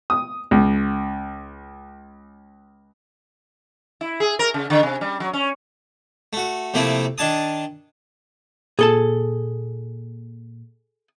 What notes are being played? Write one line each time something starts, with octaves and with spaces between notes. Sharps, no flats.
D#6
C#2
E4
G#4
A#4
C#3
D3
C3
G3
F#3
C#4
A3 F#4
C3 F3 A3 A#3 C4 E4
D#3 D4 G#5 A5 D#6
A#2 G#4 A4 A5